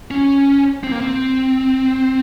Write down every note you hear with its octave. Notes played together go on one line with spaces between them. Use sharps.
C#4
C4
A#3
C4